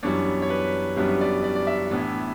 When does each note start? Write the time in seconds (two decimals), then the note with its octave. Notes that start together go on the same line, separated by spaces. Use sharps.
0.03 F#2 E3 G3 B3 D4 C#5
0.42 C#5
0.50 B4
0.97 F#2 E3 G3 B3 D4
1.21 D5
1.44 D5
1.55 D5
1.67 E5
1.91 A2 E3 B3 D4